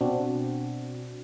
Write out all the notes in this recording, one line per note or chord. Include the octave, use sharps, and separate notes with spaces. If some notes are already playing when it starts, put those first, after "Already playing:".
B2 C4 D4 F#4